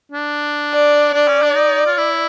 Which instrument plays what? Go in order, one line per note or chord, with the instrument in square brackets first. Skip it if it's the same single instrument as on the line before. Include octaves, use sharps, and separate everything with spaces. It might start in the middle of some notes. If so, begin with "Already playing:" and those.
[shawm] D4
[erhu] D5
[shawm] D4 [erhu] D5
[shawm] C#4
D4
D#4
F4
E4